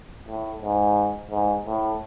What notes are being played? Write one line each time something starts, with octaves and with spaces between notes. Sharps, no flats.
A2
G#2
G#2
A2